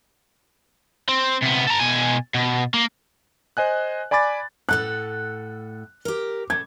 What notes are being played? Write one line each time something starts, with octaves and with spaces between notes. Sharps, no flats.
C4
C3 B3
A4 A#5
B2 G#5
B2
A#3
C5 D#5 G#5 F#6
D5 G#5 B5 D6 A6
A2 A4 F#5 F#6
G4 A#4
A3 G#6